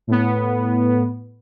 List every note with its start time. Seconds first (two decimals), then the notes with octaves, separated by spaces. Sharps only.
0.07 A2 B3